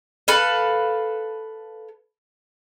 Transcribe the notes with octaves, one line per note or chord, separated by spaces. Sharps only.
A4 B4 F5